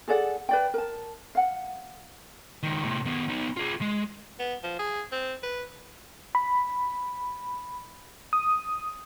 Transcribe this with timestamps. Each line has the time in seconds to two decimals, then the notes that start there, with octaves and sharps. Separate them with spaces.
0.08 G#4 A4 D5 F#5
0.49 B4 D5 G5
0.74 A#4 A5
1.35 F5 F#5
2.63 C#2 D#3
2.84 A2 C3
3.05 D#3 B3
3.28 B3 D#4
3.57 F4 G#4
3.81 G#3
4.39 B3
4.63 F3
4.79 G#4
5.12 C4
5.43 B4
6.35 B5
8.33 D#6